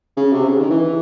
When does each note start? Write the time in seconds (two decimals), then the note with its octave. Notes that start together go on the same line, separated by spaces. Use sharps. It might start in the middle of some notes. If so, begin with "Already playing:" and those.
0.17 C#3
0.33 C3
0.49 C#3
0.59 D#3
0.70 E3